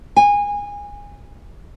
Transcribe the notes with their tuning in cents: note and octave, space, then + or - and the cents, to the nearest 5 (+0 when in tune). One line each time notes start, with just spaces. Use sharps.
G#5 -25